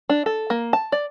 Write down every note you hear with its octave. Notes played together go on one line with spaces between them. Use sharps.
D4
A4
A#3
A5
D5